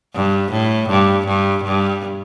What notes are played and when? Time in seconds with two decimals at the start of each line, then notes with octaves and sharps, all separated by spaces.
0.14 G2
0.52 A2
0.89 G2
1.27 G2
1.64 G2